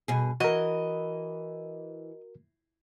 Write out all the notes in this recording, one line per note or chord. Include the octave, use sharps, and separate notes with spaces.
G2 B2 G#4
E3 F#4 A#4 D#5